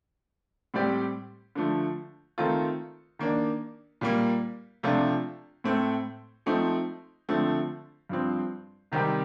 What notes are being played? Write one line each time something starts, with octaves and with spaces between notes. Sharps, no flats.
A2 G3 C4 G4 D5
D3 F3 A3
D#3 A3 C4 F4 A4
D#3 A#3 D4
A#2 G3 A#3
C3 F3 A3 D4 F4
A2 A3 C4
F3 A3 C4 D#4
D3 F3 A3 C4
G2 F3 C4
C3 D#3 G3 C4 G4